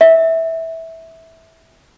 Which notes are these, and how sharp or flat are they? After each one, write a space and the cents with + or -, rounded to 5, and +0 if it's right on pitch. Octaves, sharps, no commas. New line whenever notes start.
E5 -15